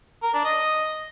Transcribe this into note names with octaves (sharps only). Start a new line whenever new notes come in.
A#4
D4
D#5